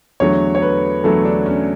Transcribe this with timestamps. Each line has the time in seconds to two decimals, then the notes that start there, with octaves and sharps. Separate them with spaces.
0.20 E2 D3 F#3 A3 C#5
0.55 C#5
0.62 B4
1.04 E2 D3 F#3 A3 A4
1.25 D4
1.46 C#4